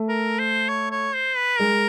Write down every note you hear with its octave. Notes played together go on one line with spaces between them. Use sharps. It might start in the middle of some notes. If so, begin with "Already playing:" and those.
Already playing: A3
A#4
C5
C#5
C#5
C5
B4
G#3 A#4